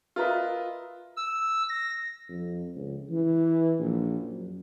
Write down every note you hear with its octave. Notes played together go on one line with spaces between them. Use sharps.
F4 A#4 B4 D#5 E5
E6
A#6
F2
C#2
E3
A#1
F#2